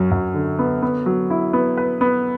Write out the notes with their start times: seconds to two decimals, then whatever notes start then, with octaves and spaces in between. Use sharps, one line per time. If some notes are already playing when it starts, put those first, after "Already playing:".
Already playing: F#2 F#3
0.11 F#2
0.34 D3
0.59 B3
0.82 B3
1.06 F#3
1.30 E4
1.53 B3
1.77 B4
2.01 B3